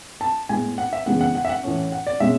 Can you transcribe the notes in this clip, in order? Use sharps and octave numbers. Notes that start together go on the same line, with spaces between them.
A5
A2 G#3 B3 G#5
F#5
E5
C#3 E3 G#3 B3 F#5
F#5
F#5
E5
F#5
A2 E3 A3 C#4
F#5
D5
B2 G#3 C#4 E5